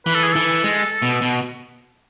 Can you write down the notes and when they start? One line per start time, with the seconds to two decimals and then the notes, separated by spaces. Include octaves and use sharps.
0.06 E3 B4
0.15 A4
0.24 G#4
0.33 E3 A4
0.64 G#3
1.02 B2
1.22 B2